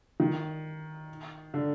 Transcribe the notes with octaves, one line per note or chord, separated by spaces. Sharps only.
D#3
D3